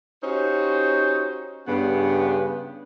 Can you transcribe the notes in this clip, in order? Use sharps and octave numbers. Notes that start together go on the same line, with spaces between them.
C#4 D#4 F#4 G4 C5
G2 C#3 B3